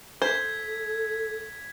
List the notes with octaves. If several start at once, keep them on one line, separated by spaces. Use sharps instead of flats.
A4 C5 G#6 B6